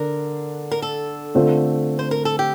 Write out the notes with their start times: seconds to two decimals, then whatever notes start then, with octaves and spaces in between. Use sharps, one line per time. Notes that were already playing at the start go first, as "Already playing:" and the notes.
Already playing: D3 D4 A#4
0.71 A#4
0.82 A4
1.35 D3 A3 C4 F4
1.99 C5
2.11 A#4
2.25 A4
2.39 G4